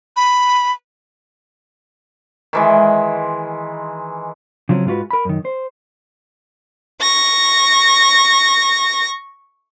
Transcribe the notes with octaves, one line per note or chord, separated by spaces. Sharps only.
B5
D#3 E3 G#3
C#3 F3 F#3 C4 C#4
G#2 G#3 F4 F#4 B4
A#4 B5
F#2 D#3
C5
C#6 A#6